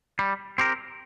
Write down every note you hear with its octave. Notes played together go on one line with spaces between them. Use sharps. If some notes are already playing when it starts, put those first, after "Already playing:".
G3
C4 G4 A#4